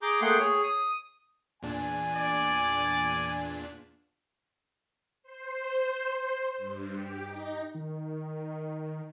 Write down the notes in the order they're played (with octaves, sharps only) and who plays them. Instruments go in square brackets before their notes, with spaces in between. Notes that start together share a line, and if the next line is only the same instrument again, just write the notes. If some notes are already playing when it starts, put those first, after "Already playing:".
[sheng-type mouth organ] G#4 A#5 D6 G6
A3 A#3 G#4 F#5 G5 C6
G#4 C#5
D#6
[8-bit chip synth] E2 A#2 D4 [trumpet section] G#5
[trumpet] D5
[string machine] C5
C5
G2
G4
D#4
[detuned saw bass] D#3